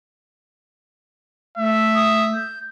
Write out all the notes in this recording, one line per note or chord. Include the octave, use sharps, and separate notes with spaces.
A3 E5
D#6
G6